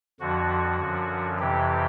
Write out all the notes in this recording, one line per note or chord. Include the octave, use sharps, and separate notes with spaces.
F2 D3 F3 F#4
F#2 D3 F3
F2 C3 E3 G4